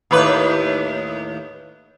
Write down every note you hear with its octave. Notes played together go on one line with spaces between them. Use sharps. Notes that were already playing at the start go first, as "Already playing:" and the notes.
D#2 A2 B4